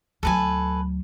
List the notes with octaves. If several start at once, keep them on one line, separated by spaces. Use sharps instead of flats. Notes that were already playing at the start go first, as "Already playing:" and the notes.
D2 F#3 A4 B4 G#5